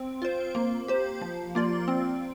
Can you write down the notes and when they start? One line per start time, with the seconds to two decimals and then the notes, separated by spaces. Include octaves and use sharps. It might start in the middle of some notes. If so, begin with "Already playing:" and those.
Already playing: C4
0.22 F4 C5
0.55 A#3
0.88 G4 C5
1.21 F3
1.55 A#3 F4 D5
1.88 C4